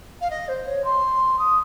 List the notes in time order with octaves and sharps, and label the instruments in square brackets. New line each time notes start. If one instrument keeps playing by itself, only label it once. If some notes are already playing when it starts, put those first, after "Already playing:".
[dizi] F5
D#5
C5
C#5
C6
D#6